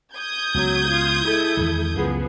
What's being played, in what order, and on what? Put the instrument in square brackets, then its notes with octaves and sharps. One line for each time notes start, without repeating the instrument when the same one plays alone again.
[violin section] D#6 G6 G#6
[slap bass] C#2 B3 [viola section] F#3
[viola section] F4
G#3 E4 A4
[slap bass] E2 D#3 E3
[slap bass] C#2 F#2 [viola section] F3 B3 G#4